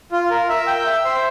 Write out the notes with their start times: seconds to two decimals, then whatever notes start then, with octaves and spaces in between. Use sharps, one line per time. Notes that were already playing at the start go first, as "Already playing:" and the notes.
0.12 F4
0.30 A#4
0.49 E5
0.67 G5
0.86 E5
1.05 C5